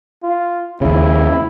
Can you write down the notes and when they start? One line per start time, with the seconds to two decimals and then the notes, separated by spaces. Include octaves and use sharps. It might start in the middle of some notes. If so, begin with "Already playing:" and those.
0.23 F4
0.81 D#2 C#3 E4